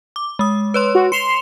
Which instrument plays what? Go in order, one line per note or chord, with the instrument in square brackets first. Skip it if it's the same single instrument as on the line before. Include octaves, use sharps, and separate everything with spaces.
[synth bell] D6
G#3 D#6
B4 C#5 C6
[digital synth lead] F#4
[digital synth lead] C6 [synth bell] C#7 E7 F7